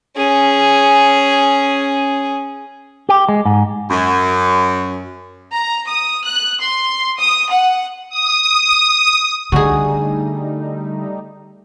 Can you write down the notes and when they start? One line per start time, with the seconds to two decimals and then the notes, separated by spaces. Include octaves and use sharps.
0.16 C#4 G#4
3.09 G4
3.29 G#3
3.45 G#2
3.90 F#2
5.53 A#5
5.87 D#6
6.25 F#6
6.60 C6
7.18 D#6
7.51 F#5
8.10 D#6
9.52 D3 G3 A3 D#4 F#4 G#4